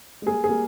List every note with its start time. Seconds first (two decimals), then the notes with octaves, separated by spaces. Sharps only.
0.22 G#3
0.26 G3 A#3 G#4
0.44 G#4
0.49 G3 A#3